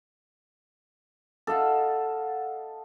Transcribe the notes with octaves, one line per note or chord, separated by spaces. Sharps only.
A4 D#5 F5 F#5